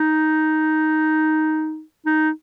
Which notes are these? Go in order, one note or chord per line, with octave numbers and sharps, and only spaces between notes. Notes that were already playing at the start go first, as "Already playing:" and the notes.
Already playing: D#4
D#4